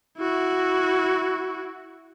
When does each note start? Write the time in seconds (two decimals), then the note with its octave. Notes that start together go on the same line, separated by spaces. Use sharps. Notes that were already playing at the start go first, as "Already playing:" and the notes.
0.18 E4 F#4